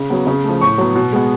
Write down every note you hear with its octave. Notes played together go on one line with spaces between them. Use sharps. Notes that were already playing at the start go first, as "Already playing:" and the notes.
Already playing: C#3
F#3 B3
C#3
F3 A3
A2 C#6
F#3 B3
B2
G#3 B3